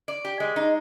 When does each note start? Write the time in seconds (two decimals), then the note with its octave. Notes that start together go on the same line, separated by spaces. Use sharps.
0.08 D5
0.25 G4
0.40 G#3
0.56 D#4